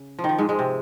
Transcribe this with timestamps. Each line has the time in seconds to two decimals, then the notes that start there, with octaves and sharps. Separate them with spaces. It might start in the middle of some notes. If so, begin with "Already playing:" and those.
Already playing: C#3
0.19 F3
0.24 D#3
0.29 F3
0.38 G#2 G#3
0.49 G#2 G#3
0.59 C3